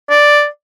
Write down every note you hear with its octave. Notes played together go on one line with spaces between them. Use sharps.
D5